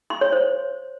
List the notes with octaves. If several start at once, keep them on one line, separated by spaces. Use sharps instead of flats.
C6
C#5
C5